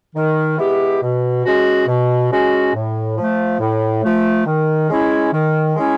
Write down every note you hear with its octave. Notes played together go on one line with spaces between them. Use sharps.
D#3
G#3 B3 E4 G4
B2
G#3 C#4 F#4
B2
G#3 C#4 F#4
A2
F3 A3
A2
F3 A3
D#3
G#3 C#4 E4
D#3
G#3 C#4 E4